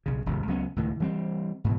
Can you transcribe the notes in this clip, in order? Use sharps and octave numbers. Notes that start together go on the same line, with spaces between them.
B1 C#3
D#1 G#1 C#2 C3
C#2 F#3 B3 C#4
C#2 A2 D#3
E3 G3 A#3 C4
G#2 B2 E3